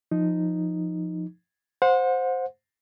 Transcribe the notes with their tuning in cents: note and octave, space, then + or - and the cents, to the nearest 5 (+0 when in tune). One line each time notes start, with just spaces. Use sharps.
F3 +0 D#4 +0
C5 +0 F#5 -35